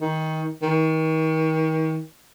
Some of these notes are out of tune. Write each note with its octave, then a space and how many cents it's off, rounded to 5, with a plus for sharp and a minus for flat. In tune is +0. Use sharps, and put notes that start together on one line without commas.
D#3 +20
D#3 +35